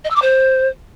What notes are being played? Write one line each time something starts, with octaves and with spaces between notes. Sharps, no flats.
D#5
E6
D6
C5